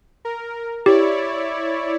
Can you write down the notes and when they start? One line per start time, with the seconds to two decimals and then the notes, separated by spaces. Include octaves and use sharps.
0.25 A#4
0.86 E4 G4 C#5 D5